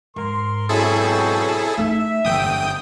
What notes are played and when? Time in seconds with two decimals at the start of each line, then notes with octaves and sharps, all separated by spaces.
0.16 G#2 A#4 C6
0.69 B2 F#3 C4 E4 G#4 A4
1.78 A3 D#4 E5
2.25 G1 E3 G5 D#6